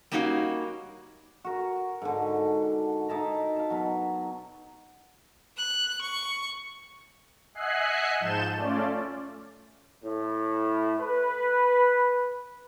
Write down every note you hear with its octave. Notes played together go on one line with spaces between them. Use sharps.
G3 A#3 C#4 D#4 F#4 F5
F#4 A#4
G#2 D3
D#4 E4 A5 A#5
F5 A5
B2 F#3
F#6
C#6
D#5 E5 F#5 G#5 F#6 C7
G#2 F3 A5 G6 E7
A3 C#4 F4 D5
A2
B4